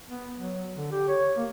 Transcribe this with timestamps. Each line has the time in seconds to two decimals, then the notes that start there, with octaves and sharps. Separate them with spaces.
0.08 B3
0.37 F#3
0.76 D3
0.92 G4
1.08 C#5
1.37 A#3